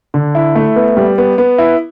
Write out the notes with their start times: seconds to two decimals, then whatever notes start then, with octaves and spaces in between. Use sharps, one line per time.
0.14 D3
0.35 E4
0.56 A3
0.76 B3
0.97 G3
1.18 B3
1.38 B3
1.58 E4